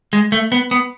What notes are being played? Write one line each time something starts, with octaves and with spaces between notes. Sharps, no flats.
G#3
A3
B3
B3